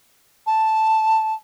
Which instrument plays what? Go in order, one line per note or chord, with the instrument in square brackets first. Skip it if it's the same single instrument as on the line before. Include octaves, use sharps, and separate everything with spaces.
[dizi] A5